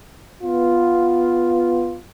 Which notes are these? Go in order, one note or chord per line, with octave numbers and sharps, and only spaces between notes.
B3 F4